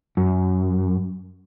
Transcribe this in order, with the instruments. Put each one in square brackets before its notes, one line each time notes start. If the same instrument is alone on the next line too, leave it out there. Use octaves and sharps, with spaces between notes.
[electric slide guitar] F#2